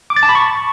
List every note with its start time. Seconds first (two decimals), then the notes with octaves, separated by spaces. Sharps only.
0.10 D6
0.16 A6
0.23 A5
0.29 B5
0.35 C#6